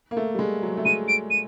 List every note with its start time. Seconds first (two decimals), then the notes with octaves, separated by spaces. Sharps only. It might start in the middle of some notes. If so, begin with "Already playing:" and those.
0.11 A#3
0.17 A3
0.35 G3
0.39 G#3
0.63 F#3
0.77 A3
0.85 G#3 D#7
1.08 D7
1.30 D#7